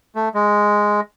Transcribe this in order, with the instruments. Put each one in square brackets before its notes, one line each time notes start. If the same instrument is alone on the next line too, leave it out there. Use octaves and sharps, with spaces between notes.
[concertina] A3
G#3